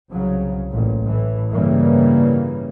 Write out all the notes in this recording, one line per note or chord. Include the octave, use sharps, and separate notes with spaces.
C2 C#3 F#3
A1 A#2
A2 E3
G2 C#3 E3 G3 A#3